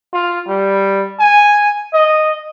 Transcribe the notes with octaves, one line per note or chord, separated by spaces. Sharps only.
F4
G3
G#5
D#5